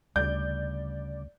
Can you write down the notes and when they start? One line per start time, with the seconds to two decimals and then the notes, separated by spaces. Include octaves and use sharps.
0.16 D2 C#3 G3 D5 G6